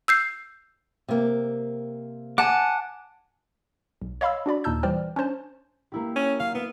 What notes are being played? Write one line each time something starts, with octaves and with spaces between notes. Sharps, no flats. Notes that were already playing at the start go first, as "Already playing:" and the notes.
E6 G6 C7
C3 A#3
F#5 G#5 A5 D6
B1
C#5 D#5 F5 B5 C6 E6
D4 F#4 D5 B5
D#2 A#2 D#4 A5 E6 G6
E3 G3 C5 D5 G5 F6
C#4 D4 C5 A5
A#3 E4 G4
C#4
F#3 F5
B3 E4